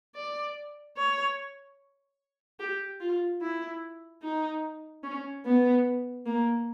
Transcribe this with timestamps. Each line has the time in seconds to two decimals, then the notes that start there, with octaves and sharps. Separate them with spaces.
0.15 D5
0.97 C#5
2.60 G4
3.00 F4
3.41 E4
4.22 D#4
5.03 C#4
5.45 B3
6.26 A#3